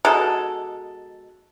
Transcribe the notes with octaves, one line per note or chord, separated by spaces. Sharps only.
B2 G#3 D#4 A4